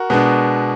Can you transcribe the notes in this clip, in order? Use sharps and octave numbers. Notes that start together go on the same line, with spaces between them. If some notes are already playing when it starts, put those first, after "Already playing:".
Already playing: F#4 A#4
B2 G#3 B3 D4